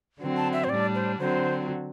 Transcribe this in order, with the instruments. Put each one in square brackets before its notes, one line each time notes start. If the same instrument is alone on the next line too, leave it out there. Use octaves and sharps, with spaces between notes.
[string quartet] D3 F#3 C4
[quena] A5
E5
C5
[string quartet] A2 G3 D4 [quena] D5
[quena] C5
[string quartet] D3 F#3 C4 [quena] C5